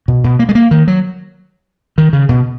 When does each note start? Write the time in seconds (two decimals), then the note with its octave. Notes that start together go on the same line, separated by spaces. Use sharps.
0.08 B2
0.24 B2
0.39 A#3
0.49 G#3
0.55 A#3
0.71 D#3
0.88 F#3
1.98 D#3
2.13 C#3
2.29 B2